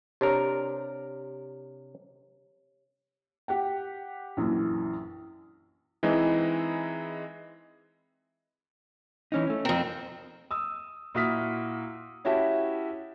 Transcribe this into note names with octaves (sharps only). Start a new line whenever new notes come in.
C3 D4 G4 A#4 C#5
G4 F#5 G5
A#1 F#2 E3
E3 G#3 C4 D#4 E4
E3 C#4 D#4
A3 C#4
F2 C4 A#4
D#6 E6
A#2 E4 F#4 D#6 F6 B6
C#4 E4 F#4 G4 E5 A5